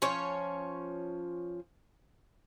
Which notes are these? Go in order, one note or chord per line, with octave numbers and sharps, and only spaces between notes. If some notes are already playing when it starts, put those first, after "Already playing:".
F3 C#4 C#5